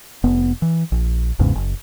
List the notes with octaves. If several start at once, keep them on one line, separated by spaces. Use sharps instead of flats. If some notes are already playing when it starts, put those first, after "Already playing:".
F1 B3
E3
A#1
G#1 E2 G#2 C#3
F#1